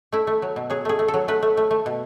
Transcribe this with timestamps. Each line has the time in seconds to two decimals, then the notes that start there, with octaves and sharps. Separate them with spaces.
0.12 A3 E4
0.27 A3
0.42 F#3
0.56 B2
0.70 F#3 G#4
0.85 A3 G#4
0.99 A3
1.08 A4
1.14 F#3
1.28 A3 B4
1.43 A3
1.57 A3
1.71 A3
1.86 B2